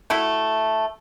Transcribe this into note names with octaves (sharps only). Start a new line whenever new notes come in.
A3 E4 F#4